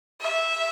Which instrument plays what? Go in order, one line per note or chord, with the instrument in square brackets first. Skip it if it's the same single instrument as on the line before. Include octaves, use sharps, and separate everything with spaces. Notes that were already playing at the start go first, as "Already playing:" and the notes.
[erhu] E5